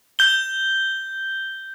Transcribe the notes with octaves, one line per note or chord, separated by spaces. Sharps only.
G6 G7